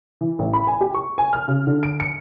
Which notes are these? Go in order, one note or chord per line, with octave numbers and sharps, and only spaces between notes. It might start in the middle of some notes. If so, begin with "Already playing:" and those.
E3
A1
B5
G#5
G4
C#6
G#5
F6
C#3
D3
D7
C#7